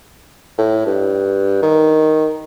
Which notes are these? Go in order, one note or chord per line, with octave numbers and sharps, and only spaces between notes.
A2
G2
D#3